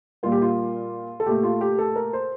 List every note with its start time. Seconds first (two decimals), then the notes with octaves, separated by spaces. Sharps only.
0.23 A#2 G3 A#3 F4
0.32 G4
0.42 F4
1.20 A4
1.26 A#2 A3 G4
1.43 F4
1.61 G4
1.78 A4
1.96 A#4
2.13 C5